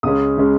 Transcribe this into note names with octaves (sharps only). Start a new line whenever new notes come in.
C#2 C#3 G#3 C#4 D#6
C#3 G#3 C#4